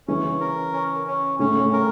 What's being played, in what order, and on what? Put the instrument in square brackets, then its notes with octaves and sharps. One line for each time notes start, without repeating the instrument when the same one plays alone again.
[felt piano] C#3 E3 [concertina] C#4
[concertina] A#4
C#4
C#4
[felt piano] A2 C#3 [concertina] C#4
[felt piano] A2
[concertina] A#4